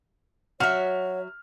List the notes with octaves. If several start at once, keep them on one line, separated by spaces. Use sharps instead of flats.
F#3 F#4 C#5 E5 F6